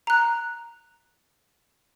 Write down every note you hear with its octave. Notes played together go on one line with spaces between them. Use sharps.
A#5 F#6